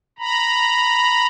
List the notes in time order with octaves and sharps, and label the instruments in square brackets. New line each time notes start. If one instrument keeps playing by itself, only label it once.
[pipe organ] A#5 B5